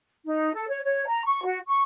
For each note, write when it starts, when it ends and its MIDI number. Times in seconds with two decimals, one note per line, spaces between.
0.25 0.53 63
0.54 0.65 69
0.69 0.80 73
0.83 1.04 73
1.06 1.21 82
1.25 1.42 85
1.45 1.59 66
1.67 1.83 85